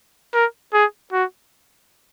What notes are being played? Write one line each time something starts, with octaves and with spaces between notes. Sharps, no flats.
A#4
G#4
F#4